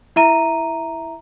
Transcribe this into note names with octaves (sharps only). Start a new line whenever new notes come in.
E4 E5 A#5 D#7